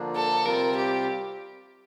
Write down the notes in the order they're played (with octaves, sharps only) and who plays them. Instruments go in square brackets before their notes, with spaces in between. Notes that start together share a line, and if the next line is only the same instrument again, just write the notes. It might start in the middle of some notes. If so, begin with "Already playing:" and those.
Already playing: [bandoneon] D3 F3 A#3 D4
[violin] A4
[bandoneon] C3 G3 C4 F4 [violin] A#4
[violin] G4